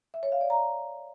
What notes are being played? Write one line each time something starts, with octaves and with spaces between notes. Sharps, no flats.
E5
C#5
F5
D5
A#5